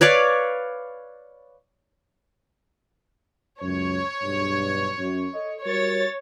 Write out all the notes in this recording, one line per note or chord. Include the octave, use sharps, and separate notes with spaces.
B4 C#5 D5 F5
C#2 F#2 C#5
B1 G2
F#2
A4 D#5
G3 F#4 A#4 C#5 A6